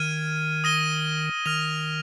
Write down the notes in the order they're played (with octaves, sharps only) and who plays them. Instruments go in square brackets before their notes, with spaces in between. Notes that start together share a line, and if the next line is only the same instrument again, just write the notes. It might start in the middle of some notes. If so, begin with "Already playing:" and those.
Already playing: [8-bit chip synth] D#3 [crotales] F6 G#6 D#7
[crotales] D#6 A#6 D#7 G7
[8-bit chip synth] D#3 [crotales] F6 A#6 F7